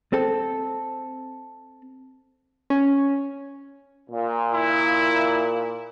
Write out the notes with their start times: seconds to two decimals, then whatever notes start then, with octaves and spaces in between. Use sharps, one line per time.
0.13 C4 A4
2.70 C#4
4.10 A#2
4.54 E4